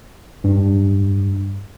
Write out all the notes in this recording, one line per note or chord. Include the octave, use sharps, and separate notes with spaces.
G2